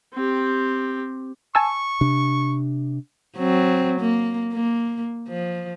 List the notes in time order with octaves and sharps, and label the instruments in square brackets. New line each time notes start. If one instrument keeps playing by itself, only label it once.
[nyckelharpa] C4 G4
[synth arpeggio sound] G#5 A5 E6 [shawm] C#6
[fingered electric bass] C3 D4
[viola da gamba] F#3 C4
A#3
A#3
F3